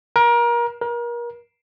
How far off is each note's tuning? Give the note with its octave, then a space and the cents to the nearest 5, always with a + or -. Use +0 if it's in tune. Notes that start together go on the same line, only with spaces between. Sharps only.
A#4 +30
A#4 +35